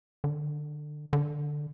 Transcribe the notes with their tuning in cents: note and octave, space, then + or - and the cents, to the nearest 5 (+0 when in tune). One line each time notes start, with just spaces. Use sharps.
D3 +25
D3 +10